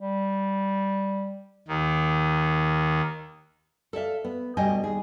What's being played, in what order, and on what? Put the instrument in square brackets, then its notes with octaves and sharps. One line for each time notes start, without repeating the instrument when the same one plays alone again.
[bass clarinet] G3
[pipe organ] D#2 D#3
[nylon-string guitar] A4 D5 E5 F5
B3
D2 B2 G3 D#5 G5 G#5
D#2 G#4